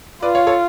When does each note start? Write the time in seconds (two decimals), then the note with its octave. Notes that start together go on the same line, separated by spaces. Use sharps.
0.22 F4 B4 D5
0.35 C#5 F5
0.47 A4 C#5